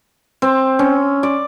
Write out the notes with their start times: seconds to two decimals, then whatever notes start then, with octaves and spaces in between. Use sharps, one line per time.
0.42 C4
0.79 C#4
1.23 D5